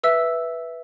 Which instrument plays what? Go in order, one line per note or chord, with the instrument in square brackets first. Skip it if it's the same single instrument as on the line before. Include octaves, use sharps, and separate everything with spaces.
[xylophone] B4 E5 E6